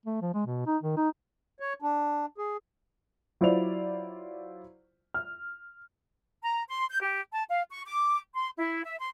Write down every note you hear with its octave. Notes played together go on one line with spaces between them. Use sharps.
A3
F3
G#3
B2
D#4
D#3
D#4
C#5
D4
G#4
F#3 E4 F4 C5 D5 F7
F6
A#5
C6
G6
G4
A5
F5
C#6
D6
C6
E4
E5
C6